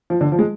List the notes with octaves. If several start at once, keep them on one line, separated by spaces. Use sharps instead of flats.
F3
D3
F3
G#3